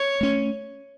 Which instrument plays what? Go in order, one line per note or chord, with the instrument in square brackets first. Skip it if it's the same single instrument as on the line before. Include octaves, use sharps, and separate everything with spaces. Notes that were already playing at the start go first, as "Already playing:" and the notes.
Already playing: [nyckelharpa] C#5
[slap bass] A3 C#4